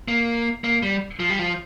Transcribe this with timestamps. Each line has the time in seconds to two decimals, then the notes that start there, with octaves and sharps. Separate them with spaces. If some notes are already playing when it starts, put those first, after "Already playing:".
0.08 A#3
0.64 A#3
0.83 G3
1.20 F3
1.30 G3
1.39 F3